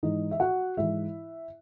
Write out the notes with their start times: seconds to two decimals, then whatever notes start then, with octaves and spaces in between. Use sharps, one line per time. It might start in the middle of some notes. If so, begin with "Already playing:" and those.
0.03 G#2 E3 D#4 D#5
0.31 E5
0.40 F#4 F#5
0.77 G#2 E3 E4 E5